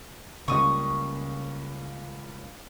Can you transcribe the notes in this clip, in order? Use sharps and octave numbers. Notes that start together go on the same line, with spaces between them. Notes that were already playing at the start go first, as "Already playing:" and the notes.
C#2 C#3 G3 A#3 C#6 D#6